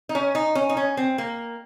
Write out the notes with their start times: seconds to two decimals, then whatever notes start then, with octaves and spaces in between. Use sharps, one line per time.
0.09 D#4
0.15 C#4
0.35 D#4
0.55 C#4
0.69 D#4
0.77 C#4
0.97 C4
1.18 A#3